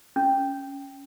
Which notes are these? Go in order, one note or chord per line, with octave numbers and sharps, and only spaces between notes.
C#4